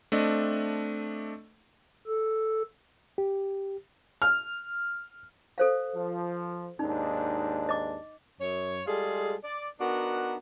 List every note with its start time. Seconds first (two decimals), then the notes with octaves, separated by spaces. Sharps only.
0.12 A3 C4 D4 D#5
2.07 A4
3.18 G4
4.22 F6
5.58 A4 C5 F5
5.95 F3
6.79 D#2 G#2 D4 D#4
7.69 D#5 D6
8.41 F#2 C#5
8.86 G3 G#3 F4 G#4 A4
9.44 D5
9.80 B3 D4 D#4 F#4 A#4